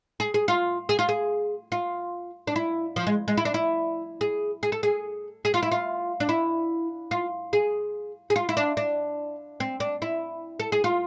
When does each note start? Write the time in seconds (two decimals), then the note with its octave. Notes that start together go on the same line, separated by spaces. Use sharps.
0.20 G#4
0.34 G#4
0.48 F4
0.89 G#4
0.99 F4
1.09 G#4
1.72 F4
2.47 D4
2.56 E4
2.96 F3
3.07 G#3
3.28 G#3
3.37 E4
3.45 D4
3.54 E4
4.21 G#4
4.63 G#4
4.72 A4
4.83 G#4
5.45 G#4
5.54 F4
5.62 E4
5.71 F4
6.20 D4
6.29 E4
7.11 F4
7.53 G#4
8.30 G#4
8.36 F4
8.49 E4
8.57 D4
8.77 D4
9.60 C4
9.80 D4
10.02 E4
10.60 A4
10.72 G#4
10.84 F4